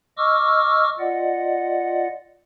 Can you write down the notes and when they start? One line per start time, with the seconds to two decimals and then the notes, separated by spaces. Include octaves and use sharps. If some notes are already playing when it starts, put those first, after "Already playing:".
0.17 D#5 C#6 D6 E6 F6
0.99 F4 D5 D#5 F#5